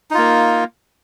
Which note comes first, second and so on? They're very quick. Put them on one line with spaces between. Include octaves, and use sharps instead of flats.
D#4 F4 A#3